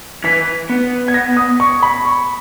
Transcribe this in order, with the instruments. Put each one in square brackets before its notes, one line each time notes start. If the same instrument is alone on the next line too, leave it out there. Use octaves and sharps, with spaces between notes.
[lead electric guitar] E3 [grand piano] B6
[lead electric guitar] B3
[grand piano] G#6
A#6
D#6
C#6
B5
C#6